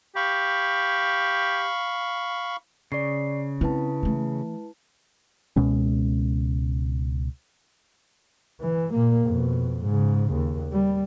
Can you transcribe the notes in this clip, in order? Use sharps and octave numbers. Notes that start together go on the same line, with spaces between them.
G4 F5 B5 C#6
C#3 D5 C#6 C7
C4 E4 B4 A5
E3 A3
C#2 B2 G#3 C#4
E3
A#2 A#3
F2 B2
G#2 C#3
D#2
G3